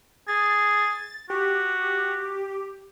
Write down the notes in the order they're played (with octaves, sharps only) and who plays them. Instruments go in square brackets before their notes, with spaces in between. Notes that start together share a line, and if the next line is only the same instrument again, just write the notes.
[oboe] G#4 [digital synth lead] A6
[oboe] F#4 [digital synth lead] G4